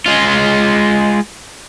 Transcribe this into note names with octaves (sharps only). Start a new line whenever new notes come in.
G#3 F4